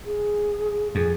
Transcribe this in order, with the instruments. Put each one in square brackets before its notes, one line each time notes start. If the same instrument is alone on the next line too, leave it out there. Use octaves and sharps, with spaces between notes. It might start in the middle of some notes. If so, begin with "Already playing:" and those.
[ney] G#4
[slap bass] F2 [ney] G#4